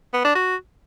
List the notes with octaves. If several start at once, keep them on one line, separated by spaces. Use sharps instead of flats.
B3
D4
F#4